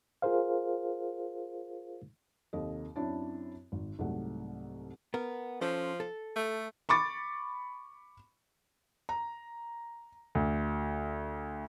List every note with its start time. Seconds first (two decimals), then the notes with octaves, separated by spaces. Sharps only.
0.22 F4 G#4 A#4 C5 F5
2.53 D#2 C3 A4 D#5
2.96 F#2 C4 D4 E4 C#5 A5
3.72 G#1
3.99 C2 G#2 F#3 A3 F#5
5.14 B3 A#4
5.61 F3 C#4 A4 C5
6.00 A4
6.36 A3
6.89 B5 C#6 D6 A6
9.09 A#5
10.35 D2